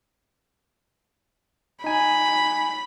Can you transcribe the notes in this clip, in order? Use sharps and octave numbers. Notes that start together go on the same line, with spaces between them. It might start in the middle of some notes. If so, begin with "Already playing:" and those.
D#4 G#5 B5